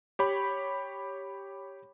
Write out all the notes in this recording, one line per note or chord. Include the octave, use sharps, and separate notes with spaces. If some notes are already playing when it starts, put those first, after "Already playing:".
G4 C#5 B5